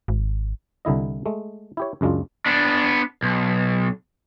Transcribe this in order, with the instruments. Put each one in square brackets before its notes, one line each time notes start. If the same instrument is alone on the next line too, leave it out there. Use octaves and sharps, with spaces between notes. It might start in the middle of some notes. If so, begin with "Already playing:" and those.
[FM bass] G#1
[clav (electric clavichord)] C2 D3 E4 D#5
G#3 A3
E4 G4 C#5
C#2 F#2 G#3 D4 F4
[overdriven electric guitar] B3 D4
B1